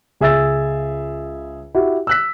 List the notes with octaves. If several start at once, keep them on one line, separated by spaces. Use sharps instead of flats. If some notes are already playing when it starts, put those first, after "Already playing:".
C#2 G#4 E5 E6 A6
E4 F#4 G4
E6 F#6 B6